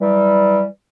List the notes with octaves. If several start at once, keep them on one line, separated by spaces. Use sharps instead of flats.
E3 F#3 G3